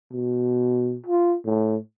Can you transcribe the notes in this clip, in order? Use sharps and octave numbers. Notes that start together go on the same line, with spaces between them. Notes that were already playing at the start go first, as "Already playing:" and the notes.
B2
F4
A2